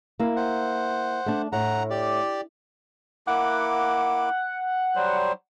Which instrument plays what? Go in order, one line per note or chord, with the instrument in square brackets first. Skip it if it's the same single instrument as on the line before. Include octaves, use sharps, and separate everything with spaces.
[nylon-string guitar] A#3 E4
[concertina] C5 F#5
[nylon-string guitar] A3 D4
[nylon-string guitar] A2 [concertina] F#5 A#5
[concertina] G4 D5
[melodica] A#3 E4 D6 [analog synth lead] F#5
[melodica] F#3 G3 C5